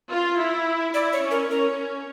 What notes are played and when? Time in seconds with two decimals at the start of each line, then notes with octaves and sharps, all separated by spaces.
0.10 F4
0.38 E4
0.94 E4 D5
1.13 C#5
1.22 C#4
1.31 A#4
1.50 C#4 A#4